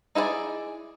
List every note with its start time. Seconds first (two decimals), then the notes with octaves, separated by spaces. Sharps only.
0.15 D#4 E4 G#4 C5 D5